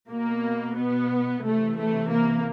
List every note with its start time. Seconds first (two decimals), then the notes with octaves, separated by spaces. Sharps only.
0.10 B2 A#3
0.77 B3
1.44 C3 E3 A3
1.78 A3
2.11 A#3